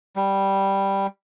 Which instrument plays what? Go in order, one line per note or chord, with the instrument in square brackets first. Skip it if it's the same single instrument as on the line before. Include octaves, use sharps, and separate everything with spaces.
[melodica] G3